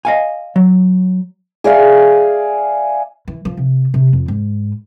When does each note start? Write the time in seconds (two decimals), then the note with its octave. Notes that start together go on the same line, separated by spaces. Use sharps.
0.05 D#5 F5 G#5
0.56 F#3
1.64 G#4 D5 E5 F5
3.28 E3
3.45 F3
3.57 C3
3.94 C3
4.13 F2
4.28 G#2